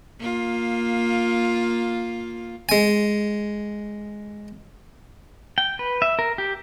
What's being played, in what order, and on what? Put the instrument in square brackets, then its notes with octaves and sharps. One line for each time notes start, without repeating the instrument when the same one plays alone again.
[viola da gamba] A#3 F4
[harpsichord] G#3 G#5
[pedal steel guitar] G5
B4
E5
A#4
G4